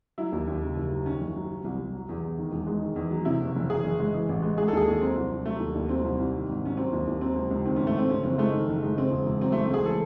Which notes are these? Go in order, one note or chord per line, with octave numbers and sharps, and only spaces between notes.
F#3 E4
D#2
D#2
C#3
F#1
F#3
D#3 C#4
F#1
F#3
F#3
C2
C2
F#3
E2
E2
D#3
E1
G#3
D#3
E2
F#3
C3 E4
F#1
F#1
E3 G#4
F#1
G#3
E3
A1
G#3
G#3 G#4
A4
D#2 G#4
D#2
F#3 C4
C2
C2
F#3 A3
D#2
D#2
F#3 C4
C2
C2
D#3
G#1
G#1 C#4
F#3 C4
D#2
D#2
F#3 C4
C#2
C#2
D#3 C4
C#4
G#1
A3
G#1 C4
C#3 C#4
F#1 C4
G#3 A3
D#3
F#1
G#3
C#3 C4
E1
E1
F#3 C4
A3
C#2
C4
C#2 G#4
E3 A4